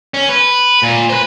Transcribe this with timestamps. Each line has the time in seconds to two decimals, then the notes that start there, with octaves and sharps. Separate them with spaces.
0.14 C#4
0.29 B4
0.83 A#2
1.09 B4 C5